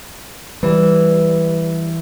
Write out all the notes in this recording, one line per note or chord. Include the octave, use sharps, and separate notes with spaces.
E3 G3